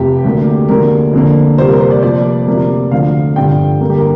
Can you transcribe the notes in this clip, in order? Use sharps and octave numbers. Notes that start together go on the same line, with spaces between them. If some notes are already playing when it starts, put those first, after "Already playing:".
Already playing: F1 F2 C3 G4
D2 D3 A#3
D2 D3 F3 A#3 A#4
F2 D3 A#3
F2 C3 G3 A#3 C5
A#4
C5
D5
F1 F2 F3 A#3 D5
D2 C3 F3 A#3
D2 D3 F3 F5
G1 F2 D3 G3 G5
G2 D3 A#3 A#4
G4
A#4